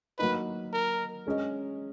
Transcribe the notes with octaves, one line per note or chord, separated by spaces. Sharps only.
F#3 A#3 D#4 B4
A#4
G#3 C#4 G#4 D#5